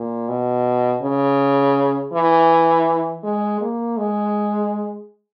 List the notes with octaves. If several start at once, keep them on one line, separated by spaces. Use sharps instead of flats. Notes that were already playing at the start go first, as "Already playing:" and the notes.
Already playing: A#2
B2
C#3
E3
G#3
A#3
G#3